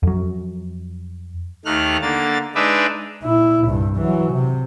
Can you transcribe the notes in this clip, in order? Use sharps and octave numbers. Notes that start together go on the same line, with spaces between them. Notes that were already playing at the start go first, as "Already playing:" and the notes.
F2 F#3
D#2 D#3 A3 F6 F#6
D3 A#3 A6
G#3 D4 D#4 B4 D5 E5
A#2 E4
C2 G2
E3 F#3
C3